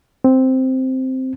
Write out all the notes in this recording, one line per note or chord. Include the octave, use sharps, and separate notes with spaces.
C4